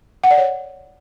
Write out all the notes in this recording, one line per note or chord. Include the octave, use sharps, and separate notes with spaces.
F#5
D5
C#5